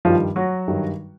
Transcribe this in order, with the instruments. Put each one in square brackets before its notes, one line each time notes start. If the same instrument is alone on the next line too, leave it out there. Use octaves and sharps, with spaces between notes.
[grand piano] G2 D#3 F3 G3 F4
F#3 F#4
G2 D#3 G3